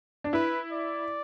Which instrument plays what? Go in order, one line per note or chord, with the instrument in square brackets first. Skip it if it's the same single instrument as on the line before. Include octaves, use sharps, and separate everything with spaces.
[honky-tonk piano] D4
[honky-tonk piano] E4 [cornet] B4
[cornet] D5